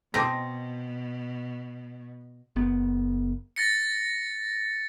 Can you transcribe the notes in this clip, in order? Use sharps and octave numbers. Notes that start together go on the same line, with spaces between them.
B2 C4 F#4 D#5 A5 D6 A#6
F#1 B3
A6 A#6 C#7